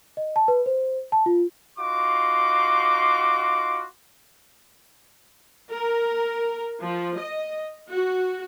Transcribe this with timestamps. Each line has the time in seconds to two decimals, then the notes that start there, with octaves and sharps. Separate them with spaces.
0.17 D#5
0.36 A5
0.48 B4
0.66 C5
1.12 A5
1.26 F4
1.78 D#4 F4 F#4 C6 D6
5.72 A#4
6.81 F3
7.17 D#5
7.89 F#4